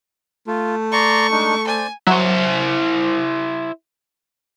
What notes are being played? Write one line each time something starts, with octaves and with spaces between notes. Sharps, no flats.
A3 F4
D5 A#5 C6 C#6
G#3 D4 D#4
C5 D5 G#5
F#3 E4 C5